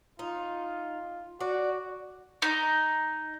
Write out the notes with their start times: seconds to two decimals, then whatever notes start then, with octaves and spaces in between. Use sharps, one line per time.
0.19 D#4 F4
1.41 F#4 D5
2.42 D#4